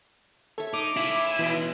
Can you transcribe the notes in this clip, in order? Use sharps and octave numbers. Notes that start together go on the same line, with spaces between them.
A4 C#5 E5
D#4 D6
G#3 C#4 E4
B2 E3